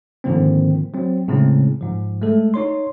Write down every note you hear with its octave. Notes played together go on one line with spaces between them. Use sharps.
G#2 D3 D#3 F3 A#3 C4
F#3 C4
A2 C#3 G#3 C4 C#4
G#2 F3
G#3 A3 A4
D#4 C#5 C6